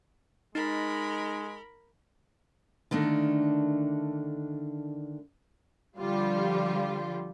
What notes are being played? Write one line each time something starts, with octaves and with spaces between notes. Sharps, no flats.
G#3 D#4 A#4 B5
D3 D#3 A3 A#3 D4
D3 F3 G3 F4